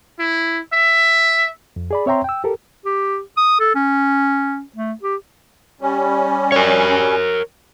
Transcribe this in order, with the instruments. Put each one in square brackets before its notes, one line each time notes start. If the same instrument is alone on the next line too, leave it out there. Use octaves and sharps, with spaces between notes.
[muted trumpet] E4
E5
[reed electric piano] F2
G#4 D5 B5
C4 C#5 E5 G5 A#5 C6
G5 E6
G4 A4 A#4
[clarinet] G4
D#6
A4
C#4
A3
G4
[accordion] G3 C#4
[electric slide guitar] A#4 C#5